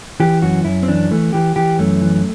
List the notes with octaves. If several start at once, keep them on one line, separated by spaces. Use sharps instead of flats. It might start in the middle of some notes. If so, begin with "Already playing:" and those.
E3 G4
F#2 F#4
F#2 E4
C4
E3 D4
E3 A3
E3 G4
E3 G4
F#2 A3
E3